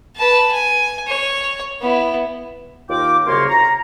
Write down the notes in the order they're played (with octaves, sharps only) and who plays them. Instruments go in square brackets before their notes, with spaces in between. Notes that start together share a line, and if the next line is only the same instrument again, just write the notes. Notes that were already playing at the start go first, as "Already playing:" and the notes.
[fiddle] B4 A5
G#5
C#5
B3 E4
[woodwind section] D#2 F4 A#4 G5 D6
C2 F#2 C#3 A#3 C#5 C6
A#5